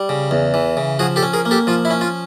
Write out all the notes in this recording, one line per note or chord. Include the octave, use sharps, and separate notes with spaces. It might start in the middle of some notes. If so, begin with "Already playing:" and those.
Already playing: G3
C#3
E2
E3
C#3
F3 F#4 G#4
G4 A4
C#4
G#4 A#4
A#3
G4 A4
F3 F4
E4
C#4
F4